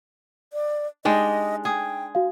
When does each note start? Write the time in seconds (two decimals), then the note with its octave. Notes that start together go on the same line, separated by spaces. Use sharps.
0.53 D5
1.05 G#3 D4 D#4 G4 D#5
1.65 G#4 G5
2.15 F#4 F5